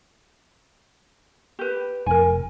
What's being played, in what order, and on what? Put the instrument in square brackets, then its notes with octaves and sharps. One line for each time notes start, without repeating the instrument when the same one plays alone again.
[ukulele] G4 B4
[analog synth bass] F1 [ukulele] A#4 G#5